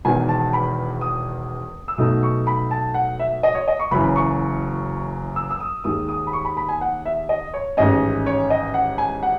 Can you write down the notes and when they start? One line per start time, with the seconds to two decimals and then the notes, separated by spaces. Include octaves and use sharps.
0.05 E1 E2 D#3 G#5
0.29 A5
0.53 B5
1.01 D#6
1.88 E6
1.98 B1 B2 A3 D#4 D#6
2.23 C#6
2.47 B5
2.71 A5
2.94 F#5
3.19 E5
3.43 D#5
3.55 C#5
3.68 D#5
3.80 C#6
3.91 F#1 F#2 E3 B5
4.16 C#6
5.36 E6
5.51 E6
5.60 D#6
5.84 D#2 D#3 G#3 D#6
6.09 D#6
6.27 B5
6.33 C#6
6.45 B5
6.57 B5
6.69 G#5
6.81 F#5
7.05 E5
7.29 D#5
7.54 C#5
7.77 A1 G#2 D#3 G#3 C#4 D#5
8.26 C#5
8.50 D#5
8.74 F#5
8.98 G#5
9.23 F#5